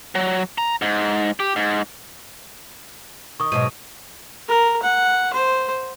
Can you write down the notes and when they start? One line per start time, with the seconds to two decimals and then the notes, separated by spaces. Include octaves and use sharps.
0.15 F#3
0.58 A#5
0.82 G#2
1.40 G4
1.56 G#2
3.40 D#3 C#6 D#6
3.52 G#2 B2 F#3 D#7
4.48 A#4
4.83 F#5
5.33 C5